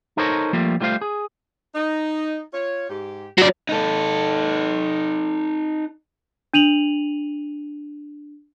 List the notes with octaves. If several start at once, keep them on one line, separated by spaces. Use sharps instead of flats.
D#4 A4 A#4 C5 C#5
F3 G3 A3 A#3 F4
G3 A3 F4 C5 F5
G#4
D#4
F4 C#5
G#2 G4
F#3 D5
D#4 A4
D4 D#7 F7 F#7